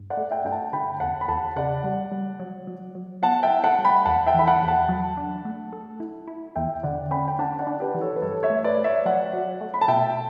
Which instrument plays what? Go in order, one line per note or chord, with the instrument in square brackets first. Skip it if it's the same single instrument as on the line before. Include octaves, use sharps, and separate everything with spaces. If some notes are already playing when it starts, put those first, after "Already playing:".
Already playing: [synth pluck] G2
[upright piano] D5 F#5
[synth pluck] A3
[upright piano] E5 G5
[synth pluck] G2 [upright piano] G5
[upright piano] F#5 A5
[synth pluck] D3 [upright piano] G5 B5
[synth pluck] E2 [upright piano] F#5 A5
[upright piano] B5
[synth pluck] E2 [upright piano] F#5 A5
[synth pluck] C#3 [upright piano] D5 F#5
[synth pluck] G3
G3
F#3
F#3
F#3
[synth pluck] B3 [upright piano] F#5 A5
[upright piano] E5 G5
[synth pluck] E4
[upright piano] F#5 A5
[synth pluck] G3
[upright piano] G5 B5
[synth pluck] E2 [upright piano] F#5 A5
[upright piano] E5 G5
[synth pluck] E3 [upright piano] B5
[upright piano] F#5 A5
[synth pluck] E2
[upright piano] F#5 A5
[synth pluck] F#3
D4
A3
A4
E4
E4
[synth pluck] E2 [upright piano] E5 G5
[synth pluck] D3 [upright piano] D5 F#5
[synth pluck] C#4 [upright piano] G5 B5
[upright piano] G5
[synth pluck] D4 [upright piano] F#5 A5
[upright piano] D5 F#5
[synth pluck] D4
[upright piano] G4 B4
[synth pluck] E3
[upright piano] A4 C#5
B4
[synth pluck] G2 [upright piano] A4 C#5
[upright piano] C#5 E5
[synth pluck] A3
[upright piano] B4 D5
[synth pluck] A3
[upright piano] C#5 E5
[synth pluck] F#3 [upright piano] D5 F#5
[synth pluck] F#3
A3
[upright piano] B5
A5
[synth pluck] B2 [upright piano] E5 G5